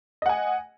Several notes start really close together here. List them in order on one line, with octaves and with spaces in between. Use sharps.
D#5 F#5 G#5